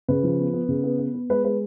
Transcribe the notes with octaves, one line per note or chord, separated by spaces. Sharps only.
C#3 B4
F3
B3
B3
C#3
B3
B3
B3
G#3 B4
G#3 B4